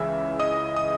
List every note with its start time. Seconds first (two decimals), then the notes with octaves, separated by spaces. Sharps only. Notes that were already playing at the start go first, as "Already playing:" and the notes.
Already playing: C#2 C#3 E3 E5 E6
0.39 D#5 D#6
0.76 D#6